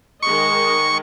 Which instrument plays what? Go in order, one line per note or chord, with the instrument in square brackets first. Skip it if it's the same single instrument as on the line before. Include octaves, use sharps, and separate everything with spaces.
[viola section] D#3 G#3 D#5 [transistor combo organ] C#6